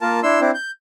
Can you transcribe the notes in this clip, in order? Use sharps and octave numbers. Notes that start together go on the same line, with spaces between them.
A#3 F4 A#4 A5
D4 E4 C6 E6
C4 D4 E4
G6